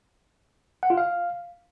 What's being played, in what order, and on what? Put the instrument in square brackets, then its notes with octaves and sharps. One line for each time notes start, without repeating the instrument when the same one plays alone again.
[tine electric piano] F#5
F4
F5